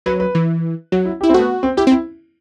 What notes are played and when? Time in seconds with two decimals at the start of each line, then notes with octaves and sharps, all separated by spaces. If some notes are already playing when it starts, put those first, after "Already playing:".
0.06 F#3 B4
0.20 B4
0.35 E3
0.92 F#3 F#4
1.05 E4
1.21 G4
1.23 E4
1.29 C4
1.34 A3 B3 F#4
1.63 C4
1.77 E4 G4
1.87 C4
1.91 E4